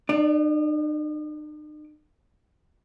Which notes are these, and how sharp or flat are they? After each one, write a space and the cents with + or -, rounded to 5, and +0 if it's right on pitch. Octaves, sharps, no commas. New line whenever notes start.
D#4 -45 D5 +0